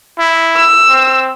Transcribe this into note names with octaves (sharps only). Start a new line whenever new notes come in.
E4
E6
C4